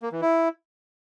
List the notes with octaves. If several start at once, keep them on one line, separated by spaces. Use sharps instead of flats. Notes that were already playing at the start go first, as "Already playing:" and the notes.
A#3
E3
E4